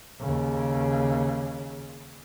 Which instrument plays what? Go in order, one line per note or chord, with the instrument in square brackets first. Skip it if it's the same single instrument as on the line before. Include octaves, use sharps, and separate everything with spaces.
[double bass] D#2 C#3